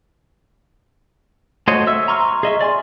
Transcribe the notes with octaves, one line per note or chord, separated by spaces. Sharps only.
A3 F#4 C5 C#5 D#5
E5 E6
A#5 C6 C#6 F6
G#4 D#5 E5
D5 G#5 C6